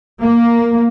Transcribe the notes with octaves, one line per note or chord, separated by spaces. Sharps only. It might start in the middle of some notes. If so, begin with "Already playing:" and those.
A#3